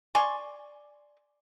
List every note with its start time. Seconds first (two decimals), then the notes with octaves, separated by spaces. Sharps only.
0.15 D5 G#5 C6 C#6